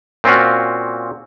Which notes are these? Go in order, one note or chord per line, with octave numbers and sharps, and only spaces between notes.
A#2 C4 C#4 F4 F#4